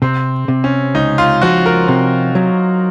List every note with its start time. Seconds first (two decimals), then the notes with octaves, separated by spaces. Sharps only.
0.02 C3 C4
0.48 C3
0.64 C#4
0.95 C#2 D#4
1.18 F4
1.42 F3 F#4
1.66 A#4
1.88 C3
2.35 F#3